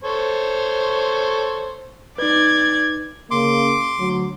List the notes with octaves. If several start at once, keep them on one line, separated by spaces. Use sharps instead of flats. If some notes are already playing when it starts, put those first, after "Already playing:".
A4 C5 C#5
D#4 B4 D5 G#6
C#3 A#3 C6 D6
D2 F#3